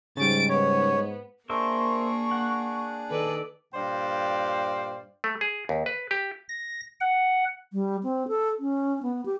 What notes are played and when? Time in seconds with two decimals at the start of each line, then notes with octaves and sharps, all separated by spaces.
0.17 G#2 C#3 G3 A6 D7
0.49 B3 C#5
1.50 A#3 D4 G#4 A#4 C5 E5 C#6
2.31 F#5
3.09 D#3 A4 B4 D5
3.74 G2 A#2 C5 D5 F5 G5
5.24 A3
5.41 G#4
5.69 D#2
5.86 B4
6.11 G4
6.49 A#6
7.01 F#5
7.72 G3
8.03 C4
8.28 A4
8.60 C#4
9.03 B3
9.26 G4